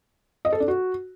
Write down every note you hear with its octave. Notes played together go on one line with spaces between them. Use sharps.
D#5
A4
D4
F#4